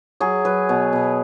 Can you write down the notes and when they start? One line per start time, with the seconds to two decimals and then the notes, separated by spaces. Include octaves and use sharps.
0.20 F#3 G#4
0.45 F#3 B4
0.69 B2
0.93 B2